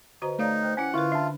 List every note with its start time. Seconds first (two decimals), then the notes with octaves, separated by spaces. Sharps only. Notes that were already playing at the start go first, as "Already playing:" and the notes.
0.22 D3 F#4 B4 C5 D#5 A#5
0.39 A3 D#4 C#5 D5 F5 A5 A#5
0.62 C5 G5 F#6
0.77 C#4 E4 F#5 G#5
0.94 D3 E4 F4 A#4 B4 C#6 F#6
1.12 D4 E5 A5